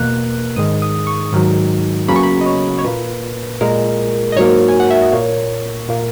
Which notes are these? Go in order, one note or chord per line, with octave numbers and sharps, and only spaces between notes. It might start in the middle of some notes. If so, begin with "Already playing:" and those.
Already playing: E2 B2 A#3 F#6
G#2 D#3 G#3 D#6
D#6
C#6
G#2 D#3 F#3
E2 C#3 F#3 A#3 B5
C#6
B5
D#5
C#5
C#5
A#2 A#3 B4
A#2 G#3 A#4
D#5
G#2 F#3 A#3 C#5
G#5
F#5
E5
D#5
A#2 A#3 C#5
A#2 A#3